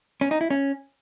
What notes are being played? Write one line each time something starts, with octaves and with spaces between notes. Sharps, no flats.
C#4
D#4
E4
C#4